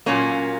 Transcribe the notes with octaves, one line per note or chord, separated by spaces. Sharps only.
A#2 F#3 A#3 C#4